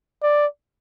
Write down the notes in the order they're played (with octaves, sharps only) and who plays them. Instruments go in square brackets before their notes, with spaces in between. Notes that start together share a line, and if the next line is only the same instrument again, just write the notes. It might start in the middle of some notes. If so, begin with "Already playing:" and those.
[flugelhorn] D5